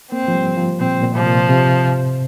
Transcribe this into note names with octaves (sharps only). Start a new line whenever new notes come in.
A#3 C4
F3
G3
F3
A#2 C4
A#2
F3
C3
A#2
C3